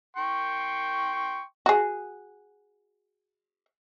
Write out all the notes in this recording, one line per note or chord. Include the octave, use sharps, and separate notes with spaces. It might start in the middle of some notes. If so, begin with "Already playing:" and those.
G5 C6 C#6
F#4 G#4